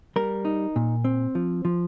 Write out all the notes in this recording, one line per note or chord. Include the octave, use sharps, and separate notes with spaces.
G3 A#4
D#4
A#2
C4
F3
F3